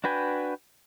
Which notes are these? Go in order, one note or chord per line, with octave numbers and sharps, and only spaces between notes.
D4 F#4 B4 G5 G#5